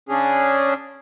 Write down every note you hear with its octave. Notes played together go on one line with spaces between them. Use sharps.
C#3 C#4 D4 G#4